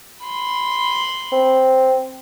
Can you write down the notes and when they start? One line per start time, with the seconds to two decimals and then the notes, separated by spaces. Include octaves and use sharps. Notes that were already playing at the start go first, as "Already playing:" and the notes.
0.22 B5 C6
1.32 C4